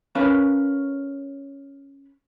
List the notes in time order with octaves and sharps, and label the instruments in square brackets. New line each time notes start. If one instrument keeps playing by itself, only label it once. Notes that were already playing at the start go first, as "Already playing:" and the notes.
[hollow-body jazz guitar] C#4 A#4 B4 F5 A5 B5